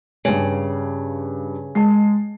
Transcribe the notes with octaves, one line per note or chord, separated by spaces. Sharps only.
G2 C#3 G3
G#3 A5 C7